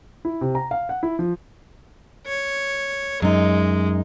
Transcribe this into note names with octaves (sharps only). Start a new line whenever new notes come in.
E4
C3
A#5
F5
F#5
E4
F3
C#5
F#2 G#3 D#4